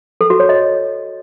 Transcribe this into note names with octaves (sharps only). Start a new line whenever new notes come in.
A4
F#4
C#5
D#5